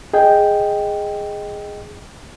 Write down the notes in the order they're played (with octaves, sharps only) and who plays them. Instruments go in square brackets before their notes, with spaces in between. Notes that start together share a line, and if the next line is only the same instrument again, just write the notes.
[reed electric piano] G#4 D#5 G5